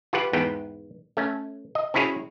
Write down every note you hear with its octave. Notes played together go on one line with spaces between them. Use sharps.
F4 G4 B4 F#5
E2 G#2 B3 G5
A3 C#4
D#5
C4 C#4 E4 F#4 G#4 C#5